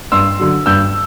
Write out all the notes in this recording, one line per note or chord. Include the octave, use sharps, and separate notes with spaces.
G2 C6 E6
D3 F#3
G2 E6 G6